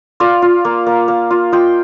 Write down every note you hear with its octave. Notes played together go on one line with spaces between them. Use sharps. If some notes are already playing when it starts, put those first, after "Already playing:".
F4 D5 F5
F4
A#3
A#3
A#3
F4
F4 D#5 G5